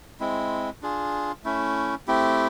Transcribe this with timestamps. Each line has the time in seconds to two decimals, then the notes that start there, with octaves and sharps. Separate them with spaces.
0.20 G#3 C4 E4
0.82 D4 F4 G#4
1.44 A3 C#4 E4
2.08 A3 C4 E4 G4